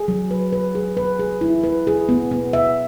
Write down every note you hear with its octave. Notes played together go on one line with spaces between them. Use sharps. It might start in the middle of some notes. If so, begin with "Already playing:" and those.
Already playing: G#4
F#3
B4
B4
G#4
B4
G#4
E4
B4
G#4
B3
B3
E5